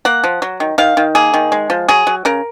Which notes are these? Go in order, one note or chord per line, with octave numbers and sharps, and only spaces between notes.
A#3 F#5
F3
F#3
D#3
D#3 F5
D#3
A#3 G#4
D#3
G#3
F3
F#3 G#4
F#3
C#3 A#4